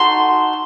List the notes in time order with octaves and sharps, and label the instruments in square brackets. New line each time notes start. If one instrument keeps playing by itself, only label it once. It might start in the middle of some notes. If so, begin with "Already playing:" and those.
Already playing: [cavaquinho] D#4 F#4 A4 C6